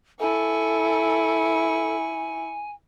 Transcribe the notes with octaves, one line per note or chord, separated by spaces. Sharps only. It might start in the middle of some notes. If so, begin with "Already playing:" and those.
E4 A4 G#5 C#6